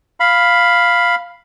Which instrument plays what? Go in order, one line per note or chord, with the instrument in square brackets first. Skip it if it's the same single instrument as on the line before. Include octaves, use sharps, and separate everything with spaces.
[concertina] F5 B5